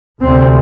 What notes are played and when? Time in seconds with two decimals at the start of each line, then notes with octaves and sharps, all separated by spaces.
0.21 D2 C3 C4